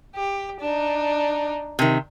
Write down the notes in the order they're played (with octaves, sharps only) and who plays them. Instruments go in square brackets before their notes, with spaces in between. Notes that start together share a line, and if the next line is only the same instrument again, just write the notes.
[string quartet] G4
D4 D#4
[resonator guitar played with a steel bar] C3 D#3